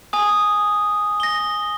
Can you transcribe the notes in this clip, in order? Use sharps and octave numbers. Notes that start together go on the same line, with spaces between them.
G#5 D#6
A#6 G7